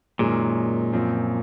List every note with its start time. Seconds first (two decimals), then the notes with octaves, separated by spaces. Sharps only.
0.19 F#2 A#2 D#3 G#3 C#4
0.93 F#2 F3 C4